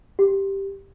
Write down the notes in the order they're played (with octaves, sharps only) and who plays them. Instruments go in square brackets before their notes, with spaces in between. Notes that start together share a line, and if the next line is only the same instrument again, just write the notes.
[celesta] G4